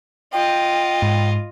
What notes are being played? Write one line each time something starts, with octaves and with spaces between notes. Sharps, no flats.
F4 D#5 G5
G#2